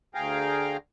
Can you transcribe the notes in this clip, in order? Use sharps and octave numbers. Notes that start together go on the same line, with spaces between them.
D2 G#4 F5 G5 A#5